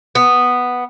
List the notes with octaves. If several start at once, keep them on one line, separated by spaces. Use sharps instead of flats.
B3